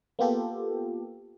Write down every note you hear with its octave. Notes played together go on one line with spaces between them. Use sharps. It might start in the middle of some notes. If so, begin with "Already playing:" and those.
A#3 B3 F4 G4 A4